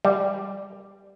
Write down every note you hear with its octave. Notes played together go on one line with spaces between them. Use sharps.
G3